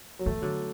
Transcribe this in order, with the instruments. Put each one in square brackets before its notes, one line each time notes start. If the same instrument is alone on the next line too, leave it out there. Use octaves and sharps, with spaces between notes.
[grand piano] F#3
[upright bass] E3 [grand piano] A3
[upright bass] D3 [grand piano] F#3